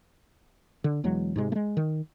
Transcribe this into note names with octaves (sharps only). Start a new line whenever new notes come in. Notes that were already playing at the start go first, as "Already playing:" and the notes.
D3
E1 E2 F#3 G#3
G#2 C3 G#3
G#3 A3
D#3